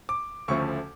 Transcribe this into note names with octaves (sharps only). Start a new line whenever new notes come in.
D6
D2 C#3 F3 A3 C#6